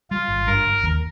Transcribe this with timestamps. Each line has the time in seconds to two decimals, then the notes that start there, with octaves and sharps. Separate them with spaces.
0.11 G3 F4
0.28 G#1
0.47 G2 A#4
0.65 G1
0.83 D#2